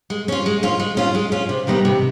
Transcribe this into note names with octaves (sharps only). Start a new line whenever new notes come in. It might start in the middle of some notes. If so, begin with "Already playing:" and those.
G#3
C#4 F4
G#3
C#4 F4
G#3
C#4 F4
G#3
C#4 F4
C3
D#3 G3 B3 D#4
C3